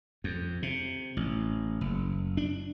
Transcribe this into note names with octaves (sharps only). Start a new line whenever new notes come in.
F2
C3
A1
F#1
D4